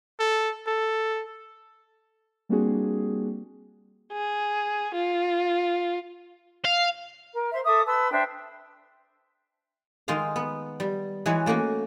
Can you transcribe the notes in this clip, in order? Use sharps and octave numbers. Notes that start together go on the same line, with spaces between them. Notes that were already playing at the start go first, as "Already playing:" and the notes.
A4
A4
G3 A#3 C4 D4 F#4 G#4
G#4
F4
F5
A#4
C5 E5 C6
A4 E5 D6 D#6
B4 A5 C6 E6
D4 C5 E5 G5
D#3 G#3 D#4 F4 F5
B3
G3
E3 G#3 F#4 B4 C#5
A3 A#3 C#4 F#4